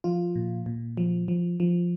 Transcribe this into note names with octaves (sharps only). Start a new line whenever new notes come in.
F3 F4
A#2
A#2
F3
F3
F3